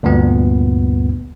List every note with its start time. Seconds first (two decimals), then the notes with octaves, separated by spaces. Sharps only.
0.03 D2 G2 A#2 B3